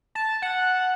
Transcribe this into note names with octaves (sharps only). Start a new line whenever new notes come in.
A5
F#5